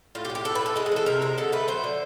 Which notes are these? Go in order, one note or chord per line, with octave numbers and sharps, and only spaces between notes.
A2 F4
G4
A2
G4
A2 A4
B4
E3 A4
G#3 G#4
G#4
E3 A4
C3 A#4
G#3 A#4
D3 A4
A3 B4
F#3 C5
D3